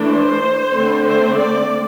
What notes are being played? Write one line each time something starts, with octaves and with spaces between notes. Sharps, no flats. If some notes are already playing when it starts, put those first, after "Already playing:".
Already playing: E3 A3 D4
C5
D3 A3 C4
C5
D5